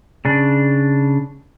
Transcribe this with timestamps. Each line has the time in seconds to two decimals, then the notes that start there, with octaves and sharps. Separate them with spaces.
0.25 C#3 D4